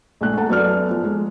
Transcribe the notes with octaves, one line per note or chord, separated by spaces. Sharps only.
A#1 G#3 A3 F#6
A4 F#5 A5 A#5
F#2 B3 A4 D5 F6
F3
G#3